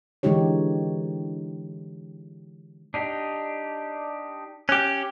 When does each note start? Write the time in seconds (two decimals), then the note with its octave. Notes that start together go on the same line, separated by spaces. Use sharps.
0.23 D3 E3 G#3 D#4 G4 C#5
2.94 D4 D#4 G4
4.69 C#4 G4 F#6